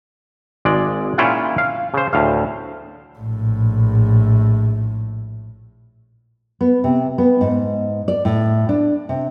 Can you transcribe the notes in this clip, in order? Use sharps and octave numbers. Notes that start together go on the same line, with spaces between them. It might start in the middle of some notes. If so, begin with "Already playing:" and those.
G#1 G#3 D5
A#2 C#4 E4 F4 F#5 G5
F5
C#3 C5
D2 A2 F5
A#1 A2
B3
C3
B3
G#2
D5
A2
D4
C3